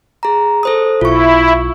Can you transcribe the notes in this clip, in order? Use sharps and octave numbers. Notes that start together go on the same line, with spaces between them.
G#4 A#5
A4 C5 D#6
B1 E4 F4 C#6